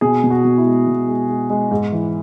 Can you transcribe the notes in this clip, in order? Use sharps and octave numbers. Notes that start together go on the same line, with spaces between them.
B2 G#4
B2
F#4
B2
E4
G#3
B2
G#3
G#3
G#3
G#2
E3